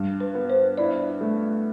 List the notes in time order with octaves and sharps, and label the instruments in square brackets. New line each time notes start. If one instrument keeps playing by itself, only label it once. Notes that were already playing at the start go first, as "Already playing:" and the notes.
Already playing: [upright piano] G2
[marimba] B4
[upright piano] B3
[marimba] C5
[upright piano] E4 [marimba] D5
[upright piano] A3